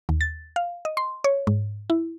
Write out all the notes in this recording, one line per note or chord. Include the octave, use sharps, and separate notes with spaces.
D#2
A6
F5
D#5
C6
C#5
G#2
E4